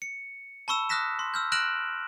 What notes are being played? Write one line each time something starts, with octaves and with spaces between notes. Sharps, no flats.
C#7
A5 B5 C#6 E6 E7
D#6 F6 F#6 A#6 B6 E7
C6
E6 F6 G6
F6 F#6 A#6 D7 E7 F#7